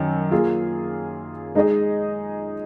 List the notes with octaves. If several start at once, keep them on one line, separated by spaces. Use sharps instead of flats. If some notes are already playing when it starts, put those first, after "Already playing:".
Already playing: F#2 D#3
A#3 F4 G#4
G#3 D#4 G#4 D#5